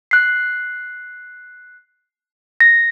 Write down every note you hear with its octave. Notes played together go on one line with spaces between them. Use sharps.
F#6 C7
A#6